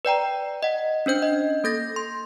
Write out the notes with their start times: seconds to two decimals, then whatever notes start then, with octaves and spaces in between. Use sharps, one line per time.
0.05 B4 D5 G5 A#5
0.63 D#5 F#5
1.06 C#4 D4 C5 G6
1.22 D#5
1.64 A#3 A4 G6 A6 A#6
1.96 C6